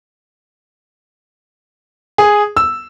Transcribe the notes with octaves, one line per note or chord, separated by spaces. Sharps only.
G#4
E6